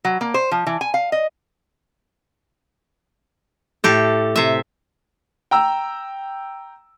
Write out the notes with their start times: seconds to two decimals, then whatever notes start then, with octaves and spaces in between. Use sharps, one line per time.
0.05 F#3
0.21 A#3
0.34 C5
0.51 F3
0.67 E3
0.81 G#5
0.94 F5
1.12 D#5
3.84 A2 G4 A4
4.36 C3 E5
5.51 G5 A#5 E6